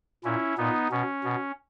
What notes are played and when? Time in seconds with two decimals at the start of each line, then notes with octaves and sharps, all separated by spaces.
0.24 A#2 C#4 E4
0.58 A#2 B3 D#4
0.91 B2 C#4
1.24 B2